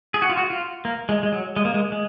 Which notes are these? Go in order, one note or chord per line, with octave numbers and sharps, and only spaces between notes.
G#4
F#4
F4
F#4
F4
A#3
G#3
G#3
F#3
G#3
A#3
G#3
G#3